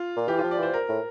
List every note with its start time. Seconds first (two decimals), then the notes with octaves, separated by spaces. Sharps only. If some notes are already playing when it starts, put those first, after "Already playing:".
Already playing: F4
0.17 A#2
0.28 E3 G4
0.39 F3 F4
0.51 D5
0.59 E3 C5
0.73 A#4
0.89 A2